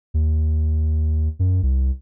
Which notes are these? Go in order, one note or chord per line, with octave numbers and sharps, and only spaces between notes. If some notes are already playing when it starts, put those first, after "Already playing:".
D#2
F#2
C2